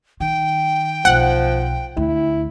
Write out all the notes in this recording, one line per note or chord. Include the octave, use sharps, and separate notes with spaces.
D#3 G5
B1 F3 F#5
D2 E4